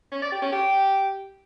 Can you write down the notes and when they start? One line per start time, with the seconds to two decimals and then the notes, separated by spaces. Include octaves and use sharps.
0.12 C#4
0.22 D5
0.32 G4
0.42 C#4
0.52 G4